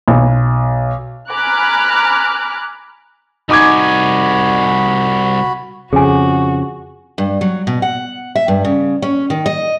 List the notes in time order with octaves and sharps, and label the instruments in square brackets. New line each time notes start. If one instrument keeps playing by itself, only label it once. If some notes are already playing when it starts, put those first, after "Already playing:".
[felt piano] B1
[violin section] G#5 A#5 B5 D6 F6 F#6
[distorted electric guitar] C2 G#5 [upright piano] D#4 D6 G#6 [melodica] F#4 B5
[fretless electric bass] F2 C#3 [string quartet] F#4 [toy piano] G#4 G#5
[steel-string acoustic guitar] G2
F#3
B2
F#5
E5
G2
C#3
C#4
D#3
D#5